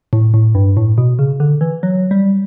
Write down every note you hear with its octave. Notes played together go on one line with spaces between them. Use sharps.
A2
A2
G2
A2
B2
C#3
D3
E3
F#3
G3